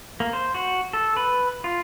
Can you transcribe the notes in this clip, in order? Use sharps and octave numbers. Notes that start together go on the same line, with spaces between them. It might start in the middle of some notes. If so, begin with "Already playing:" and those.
A#3
C5
F#4
A4
B4
F4